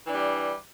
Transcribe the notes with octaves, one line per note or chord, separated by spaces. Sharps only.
E3 G3 D4